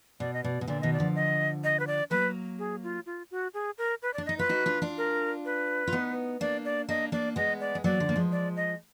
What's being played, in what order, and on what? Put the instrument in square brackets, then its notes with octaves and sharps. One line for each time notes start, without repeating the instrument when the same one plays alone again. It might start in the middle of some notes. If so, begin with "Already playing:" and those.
[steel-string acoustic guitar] B2 [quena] D5
[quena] D#5
[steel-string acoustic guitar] B2 [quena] D5
[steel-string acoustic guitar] B2
[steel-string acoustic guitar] A#2 D3 [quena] D5
[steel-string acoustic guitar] B2 D#3 [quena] D#5
[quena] D5
[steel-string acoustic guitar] D3 F3
[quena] D#5
D#5
B4
D5
[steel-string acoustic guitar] F#3 A#3 [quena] B4
[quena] G#4
F4
F4
F#4
G#4
A#4
B4
D5
[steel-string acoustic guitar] D4
[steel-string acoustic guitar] D#4 [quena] D#5
[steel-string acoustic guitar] F4 [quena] B4
[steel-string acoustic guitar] D#4 F#4
D4 F4
D4 F4
[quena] A#4
B4
[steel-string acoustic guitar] F4
B3 D#4
[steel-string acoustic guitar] A#3 D4 [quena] D5
[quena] D5
[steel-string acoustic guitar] A#3 D4 [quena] D#5
[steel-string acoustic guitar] A#3 D4 [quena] D5
[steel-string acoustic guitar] G#3 B3 [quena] D#5
[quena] D5
[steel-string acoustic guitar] G#3
[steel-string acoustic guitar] F#3 A#3 [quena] D5
[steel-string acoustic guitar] D3 F3
A#3
F3 G#3
[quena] D5
D#5